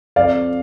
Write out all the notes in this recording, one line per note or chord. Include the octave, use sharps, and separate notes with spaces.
F2 D5 F5